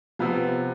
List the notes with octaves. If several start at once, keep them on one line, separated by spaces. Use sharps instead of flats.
C3 F3 B3